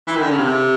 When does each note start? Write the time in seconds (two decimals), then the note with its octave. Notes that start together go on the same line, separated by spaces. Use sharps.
0.08 E3
0.15 D#3
0.23 D3
0.31 C#3
0.38 C3